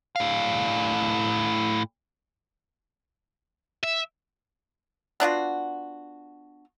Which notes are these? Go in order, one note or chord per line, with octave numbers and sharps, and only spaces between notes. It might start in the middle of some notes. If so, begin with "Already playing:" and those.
A2 F5
E5
B3 D4 F4 F#4